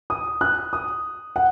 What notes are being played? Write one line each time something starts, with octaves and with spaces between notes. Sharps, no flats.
D#6
F#6
D#6
F#5